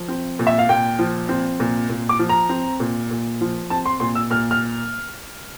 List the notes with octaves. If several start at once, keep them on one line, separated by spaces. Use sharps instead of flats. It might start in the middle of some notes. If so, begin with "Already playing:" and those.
Already playing: F3
C4
A#2
E5
F5
A#2 G5
F3
C4
A#2
A#2
D6
F3
A#5
C4
A#2
A#2
F3
C4 A5
C6
A#2 C6
E6
A#2 F6
F6